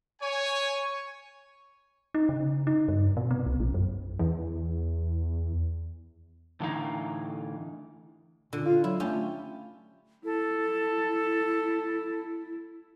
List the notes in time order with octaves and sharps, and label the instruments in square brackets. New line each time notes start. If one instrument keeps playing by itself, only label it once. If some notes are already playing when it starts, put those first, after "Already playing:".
[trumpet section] C#5 G#5
[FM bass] D#4
C#3
D#4
G2
B2
B3
C2
A#1
F#2
[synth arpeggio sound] E2
[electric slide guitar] A2 D3 E3 D#4 F5 A#5
[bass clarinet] A#2 [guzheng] D3
[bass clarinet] F4
[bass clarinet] F#3 [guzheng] E4
[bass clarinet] A3 [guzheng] C#4 F4 G4
[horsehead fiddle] E4 [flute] A4